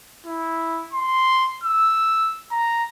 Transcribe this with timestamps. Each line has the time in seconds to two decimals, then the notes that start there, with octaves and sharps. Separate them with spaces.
0.26 E4
0.93 C6
1.63 E6
2.51 A#5